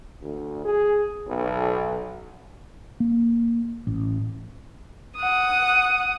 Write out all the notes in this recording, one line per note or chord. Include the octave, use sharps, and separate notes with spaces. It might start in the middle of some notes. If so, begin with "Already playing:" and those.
D2
G#4
B1
A#3
A1
F#5 D#6